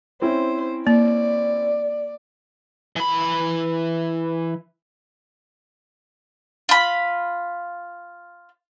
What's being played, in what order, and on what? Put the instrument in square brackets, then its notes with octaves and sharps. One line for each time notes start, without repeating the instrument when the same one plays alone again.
[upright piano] C4 C#4 E4 [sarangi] C5
[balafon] A#3 [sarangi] D5
[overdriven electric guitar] E3 B5
[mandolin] F4 B5